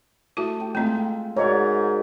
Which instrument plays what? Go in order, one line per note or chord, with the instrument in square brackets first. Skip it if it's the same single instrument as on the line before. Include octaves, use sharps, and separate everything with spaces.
[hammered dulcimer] A3 [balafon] E4 F#4
[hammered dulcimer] G4
[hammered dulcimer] G#3 F4 E5 [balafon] A3 C4
[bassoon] G#2 [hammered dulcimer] F#4 A#4 [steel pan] C#5 D5